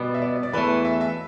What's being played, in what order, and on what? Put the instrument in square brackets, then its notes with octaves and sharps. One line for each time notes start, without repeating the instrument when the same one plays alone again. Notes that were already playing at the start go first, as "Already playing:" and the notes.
Already playing: [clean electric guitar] B2 G3 B3 [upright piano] D5
[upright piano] E5
D5
D5
[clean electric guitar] E2 E3 A3 [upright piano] B4
[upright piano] E5
E5